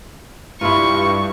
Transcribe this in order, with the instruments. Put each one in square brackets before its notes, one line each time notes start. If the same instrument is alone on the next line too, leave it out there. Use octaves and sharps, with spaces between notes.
[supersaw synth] G2 [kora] E4 F4 [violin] C#6